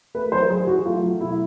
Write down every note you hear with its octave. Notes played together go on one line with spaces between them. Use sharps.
A3 B4
F#3 C5
F#3 G#4
F#3 F#4
A3 F4
F#3
B2 E4